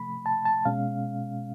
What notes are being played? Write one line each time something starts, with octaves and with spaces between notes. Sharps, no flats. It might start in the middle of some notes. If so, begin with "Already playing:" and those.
Already playing: C3 F3 A3 B5
A5
A5
B2 G#3 C#4 F5